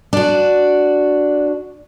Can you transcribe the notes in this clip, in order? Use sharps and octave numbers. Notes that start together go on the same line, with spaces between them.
D4 F#4